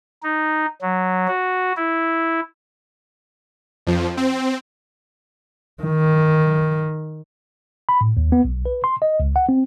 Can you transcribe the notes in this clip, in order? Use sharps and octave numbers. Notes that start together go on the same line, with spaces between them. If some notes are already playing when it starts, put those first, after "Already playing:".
D#4
F#3
F#4
E4
F2 F3
C4
D#3
B5
A2
D#2
B3
B1
B4
C6
D#5
C#2
F#5
C4